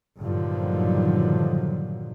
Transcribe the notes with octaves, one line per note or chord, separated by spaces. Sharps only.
G2 A#2 D3 D#3 F3 F#3